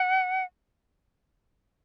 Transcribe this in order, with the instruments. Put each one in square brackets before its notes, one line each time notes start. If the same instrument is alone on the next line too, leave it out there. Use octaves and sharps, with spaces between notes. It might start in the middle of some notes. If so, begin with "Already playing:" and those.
Already playing: [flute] F#5